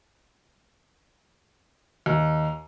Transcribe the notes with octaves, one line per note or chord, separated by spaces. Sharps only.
D#2